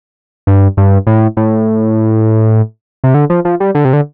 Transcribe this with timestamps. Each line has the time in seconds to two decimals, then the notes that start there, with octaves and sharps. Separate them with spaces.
0.47 G2
0.77 G2
1.07 A2
1.37 A2
3.04 C3
3.14 D3
3.30 F3
3.45 F3
3.60 G3
3.75 D3
3.85 C3
3.93 D3